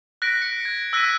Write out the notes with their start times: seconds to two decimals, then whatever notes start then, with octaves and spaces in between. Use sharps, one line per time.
0.22 F#6 A#6 B6 D7
0.42 C#7
0.65 G#6
0.93 E6 F#6 A#6 B6 C#7 D#7